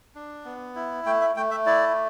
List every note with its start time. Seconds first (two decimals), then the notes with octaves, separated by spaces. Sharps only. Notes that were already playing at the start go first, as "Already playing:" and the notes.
0.15 D4
0.45 B3
0.76 E4
1.05 A3 G5
1.21 E5
1.36 A3 G5
1.51 E5
1.66 E4 D5